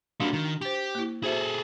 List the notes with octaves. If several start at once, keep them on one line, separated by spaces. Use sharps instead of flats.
G3 A#3 D4 F#4 F5
D#3
G4 C5 D6
A#3 E4
F#4 G#4 A4 C5 E5